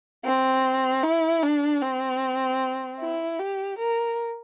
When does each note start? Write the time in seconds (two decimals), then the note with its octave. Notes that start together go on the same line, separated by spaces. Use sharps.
0.25 C4
1.03 E4
1.43 D4
1.82 C4
3.00 E4
3.39 G4
3.79 A#4